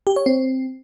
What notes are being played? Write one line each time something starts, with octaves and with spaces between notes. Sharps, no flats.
G4
C#5
C4